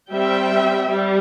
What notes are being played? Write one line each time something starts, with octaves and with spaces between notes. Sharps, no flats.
G3 C4 E5 G5
G3